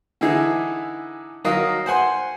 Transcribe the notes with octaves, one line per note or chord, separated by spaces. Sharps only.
D3 E3 D#4 E4 G#4
D#3 F#3 A#4 D#5 F5 D#6
C5 F#5 G#5 C6